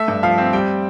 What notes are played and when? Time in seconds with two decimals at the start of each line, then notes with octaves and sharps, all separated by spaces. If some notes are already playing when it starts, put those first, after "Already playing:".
Already playing: A3 E5
0.08 G2
0.23 F3 F5
0.38 C4
0.53 G3 G5